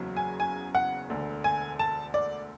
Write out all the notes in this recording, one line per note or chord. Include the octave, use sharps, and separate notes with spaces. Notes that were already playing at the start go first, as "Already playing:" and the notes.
Already playing: F#1 E2 C#3 F#3
G#5
G#5
F#5
E1 D2 D3
G#5
A5
D5